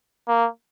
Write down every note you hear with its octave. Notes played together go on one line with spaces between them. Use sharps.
A#3